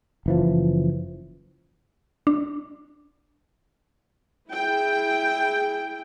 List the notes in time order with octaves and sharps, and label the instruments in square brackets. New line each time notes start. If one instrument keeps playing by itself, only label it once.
[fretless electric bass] F#1 E3 F3
[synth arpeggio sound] D4
[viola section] E4 G#4 G5